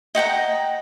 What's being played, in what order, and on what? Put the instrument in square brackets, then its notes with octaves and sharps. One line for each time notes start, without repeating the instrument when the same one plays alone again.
[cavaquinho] D#5 F#5 G5 A#5